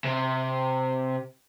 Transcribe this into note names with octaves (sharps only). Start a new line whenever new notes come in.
C3